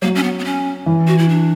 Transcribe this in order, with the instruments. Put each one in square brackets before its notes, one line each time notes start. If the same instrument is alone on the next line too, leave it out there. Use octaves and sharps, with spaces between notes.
[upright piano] F#3 [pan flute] A#3
[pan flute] C#4
B3
B3
C#4
[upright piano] E3
[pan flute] F#4
E4
D4